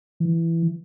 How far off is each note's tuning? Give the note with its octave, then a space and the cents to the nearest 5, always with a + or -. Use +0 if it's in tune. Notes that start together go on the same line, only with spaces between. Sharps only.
E3 +10